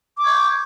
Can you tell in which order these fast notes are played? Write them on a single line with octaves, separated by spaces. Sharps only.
D6 C#6 G#6 G6